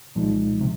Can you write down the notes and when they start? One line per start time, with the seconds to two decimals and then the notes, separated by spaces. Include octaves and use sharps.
0.15 C2 A#2 F3 G#3 D#4
0.61 C3